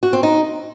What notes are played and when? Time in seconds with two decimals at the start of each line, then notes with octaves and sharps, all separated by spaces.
0.03 F#4
0.13 C4
0.23 D#4